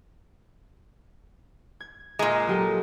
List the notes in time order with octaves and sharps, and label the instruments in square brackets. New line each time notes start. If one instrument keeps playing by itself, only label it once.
[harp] G#6
[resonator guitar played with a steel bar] A#2 G#3 [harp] A#5 C6
[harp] F#3 G4 A4